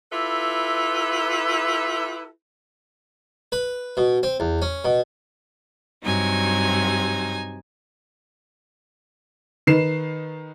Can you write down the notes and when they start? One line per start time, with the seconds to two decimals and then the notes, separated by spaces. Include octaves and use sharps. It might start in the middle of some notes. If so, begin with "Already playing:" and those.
0.12 E4 F4 G4 A4 B4 E5
3.52 B4
3.97 B2
4.23 C4
4.40 E2
4.62 C#4
4.85 B2
6.03 G2 C3 F#3 D#4 G#5
9.67 D#3 D#4 B4 C7 E7